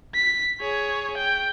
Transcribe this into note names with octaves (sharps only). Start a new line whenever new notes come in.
B6
G#4 C#5
G5